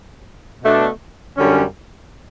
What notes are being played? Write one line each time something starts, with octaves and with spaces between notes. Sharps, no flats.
B2 A3 D4
F#2 D3 G3 C#4